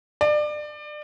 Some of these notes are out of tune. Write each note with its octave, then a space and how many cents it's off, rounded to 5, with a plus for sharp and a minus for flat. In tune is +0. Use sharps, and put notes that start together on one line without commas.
D5 +30